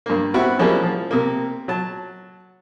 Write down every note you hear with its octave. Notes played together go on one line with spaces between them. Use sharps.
G2 A#3
B3 C4 E4 F#4 G4
F3 G3 A#3 C#4 E4 G#4
F3
C3 A#3
F#3 A5